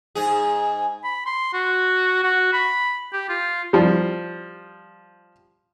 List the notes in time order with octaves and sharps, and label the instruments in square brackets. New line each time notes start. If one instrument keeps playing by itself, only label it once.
[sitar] G#2 G#4
[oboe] B5
C6
F#4
F#4
B5
G4
F4
[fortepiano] F3 G3